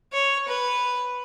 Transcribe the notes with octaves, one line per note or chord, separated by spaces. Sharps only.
C#5
B4